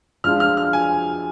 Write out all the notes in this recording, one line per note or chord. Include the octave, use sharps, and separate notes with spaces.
F3 G#3 D4 F4 F6
F6
F6
G#5